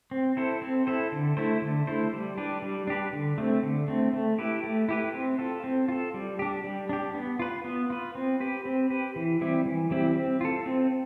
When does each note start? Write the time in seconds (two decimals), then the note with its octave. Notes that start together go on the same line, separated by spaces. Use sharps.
0.11 C4
0.37 E4 A4 C5
0.62 C4
0.87 E4 A4 C5
1.12 D3
1.37 A3 E4 A4 C5
1.62 D3
1.87 A3 E4 A4 C5
2.13 G3
2.38 D4 G4 B4
2.62 G3
2.87 D4 G4 B4
3.13 D3
3.38 A3 C4
3.63 D3
3.88 A3 C4
4.13 A3
4.38 E4 G4 B4
4.64 A3
4.89 E4 G4 B4
5.14 C4
5.39 F4 A4
5.64 C4
5.88 F4 A4
6.14 G3
6.39 D4 G4
6.64 G3
6.89 D4 G4
7.15 B3
7.39 F4 B4
7.65 B3
7.90 F4 B4
8.15 C4
8.40 G4 B4
8.65 C4
8.90 G4 B4
9.16 E3
9.41 G3 C4 E4 G4
9.66 E3
9.91 G3 C4 E4 G4
10.16 C4
10.41 F4 A4
10.66 C4